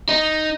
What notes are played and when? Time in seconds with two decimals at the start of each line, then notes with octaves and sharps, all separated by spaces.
0.09 D#4